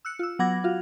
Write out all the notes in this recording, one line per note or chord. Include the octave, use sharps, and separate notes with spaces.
E6 F#6 C#7
F4 E6
F#3 B3 F#5 D6 G#6 A#6
F4 F#4 F5